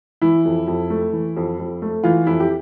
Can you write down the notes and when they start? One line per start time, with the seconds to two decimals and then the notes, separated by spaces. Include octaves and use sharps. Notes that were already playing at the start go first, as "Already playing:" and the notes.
0.22 E3 E4
0.45 F2
0.67 F2
0.90 A3
1.13 E3
1.37 F2
1.59 F2
1.82 A3
2.04 E3 F4
2.27 F2 E4
2.40 G4